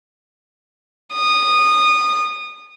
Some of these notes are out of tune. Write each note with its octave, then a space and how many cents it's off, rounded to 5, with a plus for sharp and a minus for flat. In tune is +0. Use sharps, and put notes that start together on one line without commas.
D#6 -20